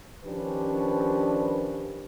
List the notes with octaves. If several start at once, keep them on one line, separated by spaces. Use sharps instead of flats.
D#3 F3 C#4 D4 G4 B4